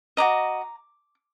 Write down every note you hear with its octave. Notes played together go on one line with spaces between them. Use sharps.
F#4 B4 D#5 A#5 D6